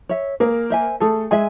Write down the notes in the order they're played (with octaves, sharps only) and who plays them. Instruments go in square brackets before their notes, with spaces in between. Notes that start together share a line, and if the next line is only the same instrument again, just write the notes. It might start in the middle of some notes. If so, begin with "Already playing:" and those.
[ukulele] C#5 E5
[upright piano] A#3 A#4 [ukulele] G#4
[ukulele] C5 E5 G#5
[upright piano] A3 A4 [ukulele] G#4
[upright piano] G#3 G#4 [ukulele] E5 G#5